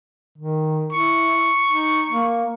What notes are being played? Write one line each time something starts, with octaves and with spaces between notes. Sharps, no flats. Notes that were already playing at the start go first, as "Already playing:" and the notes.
D#3
E4 C#6
D#4
A#3